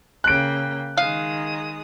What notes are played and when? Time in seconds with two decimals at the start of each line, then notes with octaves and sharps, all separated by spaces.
0.24 C#3 A#3 G5 F#6 D7
0.97 D#3 G#3 F5 D#6